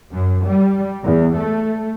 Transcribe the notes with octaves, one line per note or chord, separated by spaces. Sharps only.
F#2
G3
E2
A3